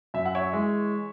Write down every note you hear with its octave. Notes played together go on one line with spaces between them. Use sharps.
F#2 E5
F#5
C#5 E5
E3 G#3